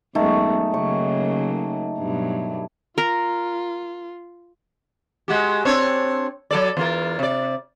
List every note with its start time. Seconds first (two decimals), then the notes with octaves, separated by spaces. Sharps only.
0.15 F#2 D#3 G#3 A3 B3
0.74 C#3 F#3 A#3 C#6
1.98 G2 B2 F#3
2.98 F4 A#4
5.28 G#3 F#4 G4
5.65 C4 D4 C#5
6.51 F#3 A4 D5
6.77 E2 F4 A#4
7.19 C3 D5